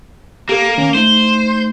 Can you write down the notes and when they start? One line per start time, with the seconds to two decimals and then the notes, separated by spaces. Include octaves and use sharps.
0.49 A#3 G4 A4
0.78 D#3 C#4
0.95 A3 D#4 C5